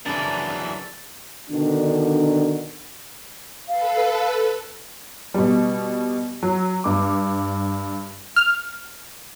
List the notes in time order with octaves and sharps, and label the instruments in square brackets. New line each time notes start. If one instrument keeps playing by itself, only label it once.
[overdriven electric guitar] F#2 E3 [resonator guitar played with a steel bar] C#3 D4 [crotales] A6
[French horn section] B2 D3 D#3 D4
[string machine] A4 B4 [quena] F5
[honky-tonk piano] B2 G3
F#3
G2 D6
[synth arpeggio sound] F6